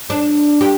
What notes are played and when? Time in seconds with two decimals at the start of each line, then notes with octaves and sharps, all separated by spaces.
0.10 D4
0.61 G4